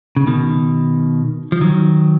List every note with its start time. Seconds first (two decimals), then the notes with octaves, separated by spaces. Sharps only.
0.16 C#3
0.27 B2 D#3
1.52 F3
1.61 D#3 F#3